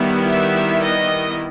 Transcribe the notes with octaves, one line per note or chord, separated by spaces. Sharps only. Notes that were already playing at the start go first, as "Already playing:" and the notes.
Already playing: D#3 G3 B3 E4
E5
D#5